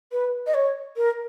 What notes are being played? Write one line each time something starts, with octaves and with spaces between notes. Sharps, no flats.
B4
D#5
C#5
A#4